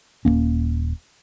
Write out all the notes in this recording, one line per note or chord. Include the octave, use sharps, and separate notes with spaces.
D#1 A#2 A#3 C#4